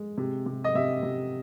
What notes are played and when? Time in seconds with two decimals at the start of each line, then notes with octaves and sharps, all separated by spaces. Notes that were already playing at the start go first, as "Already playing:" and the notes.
Already playing: G#3
0.18 C3
0.46 C3
0.64 D#5
0.75 C3 E5
1.03 C3